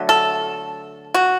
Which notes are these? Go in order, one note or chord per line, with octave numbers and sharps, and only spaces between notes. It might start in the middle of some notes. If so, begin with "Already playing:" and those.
Already playing: D3 F#3 A3
A4
F#4